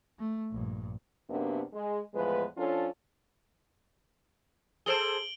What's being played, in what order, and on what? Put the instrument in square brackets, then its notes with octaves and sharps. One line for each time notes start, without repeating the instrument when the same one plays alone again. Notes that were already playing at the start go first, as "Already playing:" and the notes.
[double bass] A3
A#1 G2
[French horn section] F#2 C3 A#3 B3 D4
G#3
E2 A2 F3 G#3 B4
F3 C#4 D4 F4 A4 C#5
[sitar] G#4 A4 C5 [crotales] D7 F#7 G7